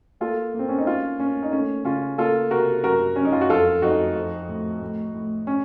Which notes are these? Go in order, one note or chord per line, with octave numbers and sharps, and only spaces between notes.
A#3 F4 A4
A#3
C4
C#4
D#4
A#3 C#4 F4
A#3 C#4
D#4
A3 C#4
C#3 C#4 F4
A#3 F4 A4
C3 F#4 A#4
F#2 F#4 A#4
F#2 C#4
D#4
F4
F#4
F2 F4 A4
F2 D#4 F#4
F3
A2
A2
A2
C#4